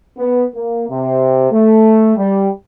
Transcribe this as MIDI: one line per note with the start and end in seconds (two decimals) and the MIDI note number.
0.18 0.44 59
0.54 0.84 58
0.89 1.48 48
1.51 2.14 57
2.16 2.49 55